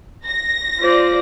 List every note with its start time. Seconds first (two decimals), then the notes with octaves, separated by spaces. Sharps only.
0.25 A#6
0.79 F4 C5 D5